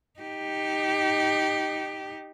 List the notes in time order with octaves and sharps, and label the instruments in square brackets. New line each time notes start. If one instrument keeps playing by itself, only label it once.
[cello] D#4 G4